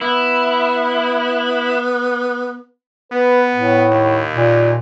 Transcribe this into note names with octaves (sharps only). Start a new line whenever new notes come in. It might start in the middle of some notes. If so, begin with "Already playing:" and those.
B3 E4
B3 B4
A2
D#2
A#2